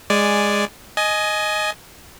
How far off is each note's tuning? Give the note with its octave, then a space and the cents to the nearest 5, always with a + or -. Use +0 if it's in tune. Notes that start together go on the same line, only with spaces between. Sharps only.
G#3 -10 D5 +0 G#5 -5
D#5 +0 G#5 +20